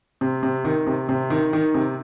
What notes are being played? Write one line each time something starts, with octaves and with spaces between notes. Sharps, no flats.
C3
C3
D#3
C3
C3
D#3
D#3
C3